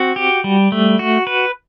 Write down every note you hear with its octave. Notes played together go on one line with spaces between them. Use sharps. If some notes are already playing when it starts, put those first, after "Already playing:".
Already playing: C4 F#4
G4
G3
A3
F#4
B4